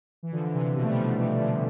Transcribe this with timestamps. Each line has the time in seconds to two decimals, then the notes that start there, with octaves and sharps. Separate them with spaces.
0.23 E3
0.32 D3 F3
0.53 C3 E3
0.75 B2 D3
0.83 A3
0.89 G3
0.97 D3 F3
1.18 E3 G3
1.40 D3 F3